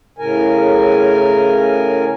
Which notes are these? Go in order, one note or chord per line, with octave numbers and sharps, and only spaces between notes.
A2 C#3 A#4 G#5